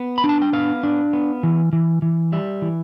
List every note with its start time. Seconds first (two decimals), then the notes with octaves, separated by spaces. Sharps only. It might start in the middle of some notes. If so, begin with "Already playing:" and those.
Already playing: B3
0.18 B5
0.24 D4
0.29 A5
0.42 G5
0.53 B3 F5
0.83 D4
1.13 B3
1.43 E3
1.73 E3
2.02 E3
2.32 G3 E5
2.62 E3